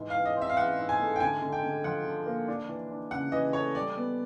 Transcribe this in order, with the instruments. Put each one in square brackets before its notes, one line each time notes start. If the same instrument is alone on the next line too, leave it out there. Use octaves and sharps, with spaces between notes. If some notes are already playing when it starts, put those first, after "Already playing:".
Already playing: [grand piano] G#2 E3
[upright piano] F5
[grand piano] E3
[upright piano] D#5
[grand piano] C4
[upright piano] E5
F5
[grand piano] E3 [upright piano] F#5
[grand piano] G#2
[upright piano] G#5
[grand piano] A3
[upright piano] G5
[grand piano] D3 [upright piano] G#5
[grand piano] D3
[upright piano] G5
[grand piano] D3
[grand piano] F3 [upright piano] F#5
[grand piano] D3
A#3
D4
E3
D4
[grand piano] C#3 [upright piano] F#5
[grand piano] E3 [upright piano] D#5
[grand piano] A3 [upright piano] C#5
[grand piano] G3 [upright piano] D5
[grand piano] B3